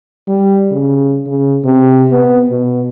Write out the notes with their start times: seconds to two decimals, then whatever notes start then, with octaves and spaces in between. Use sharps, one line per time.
0.28 G3
0.71 C#3
1.27 C#3
1.65 C3
2.11 B3
2.50 B2